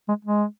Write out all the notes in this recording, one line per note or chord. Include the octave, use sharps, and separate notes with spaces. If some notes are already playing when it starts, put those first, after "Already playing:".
G#3
G#3